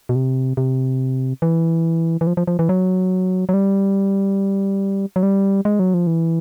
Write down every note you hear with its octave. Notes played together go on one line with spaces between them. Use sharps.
B2
C3
C3
E3
E3
F3
F3
F3
E3
F#3
F#3
G3
F#3
G3
G#3
F#3
F3
E3